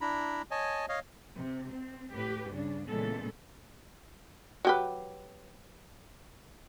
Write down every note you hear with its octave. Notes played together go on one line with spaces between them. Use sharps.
D4 E4 A#5 B5
C#5 D#5 G#5 A5
C#5 D#5 F5
C3
C4
A2 G4 B4
G2 C#3 D4
A#2 C#3 E3 G#3 B3 A4
F#3 G4 B4